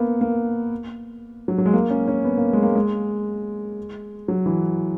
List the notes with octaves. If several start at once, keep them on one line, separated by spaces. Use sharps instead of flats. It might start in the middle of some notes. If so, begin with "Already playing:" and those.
Already playing: A#3 B3
A#3
F#3
F#3
G#3
A#3
C#4
C#4
B3
A#3
G#3
A#3
G#3
F#3
E3